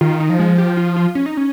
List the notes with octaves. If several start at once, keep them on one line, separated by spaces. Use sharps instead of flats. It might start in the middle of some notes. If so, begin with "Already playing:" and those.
D#3 F4
D#4
F3
G#3
G4
F4
F4
C#4
D#4
C#4